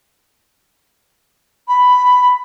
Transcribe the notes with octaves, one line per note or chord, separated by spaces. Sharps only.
B5